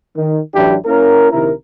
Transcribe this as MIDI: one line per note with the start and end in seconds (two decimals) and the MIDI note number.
0.17 0.40 51
0.55 0.76 33
0.55 0.76 52
0.55 0.76 54
0.55 0.76 62
0.55 0.76 64
0.55 0.76 67
0.85 1.30 58
0.85 1.30 61
0.85 1.30 64
0.85 1.30 70
1.32 1.52 34
1.32 1.52 48
1.32 1.52 51
1.32 1.52 64
1.32 1.52 70